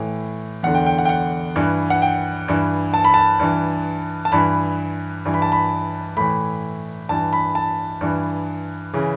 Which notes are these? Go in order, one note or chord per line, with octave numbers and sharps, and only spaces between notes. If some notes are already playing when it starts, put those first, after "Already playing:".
Already playing: A2 E3
E2 D3 F#5
G5
G5
F#5
G5
F#5
G2 E3
F#5
G5
G2 E3
A5
B5
A5
G2 E3
A5
G2 E3 B5
G2 E3
B5
A5
B5
A2 E3 B5
G2 E3 A5
B5
A5
G2 E3
C#3 E3